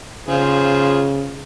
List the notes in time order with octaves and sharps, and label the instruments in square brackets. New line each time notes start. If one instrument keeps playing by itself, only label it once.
[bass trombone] C#3 [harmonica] F4 G#4 C5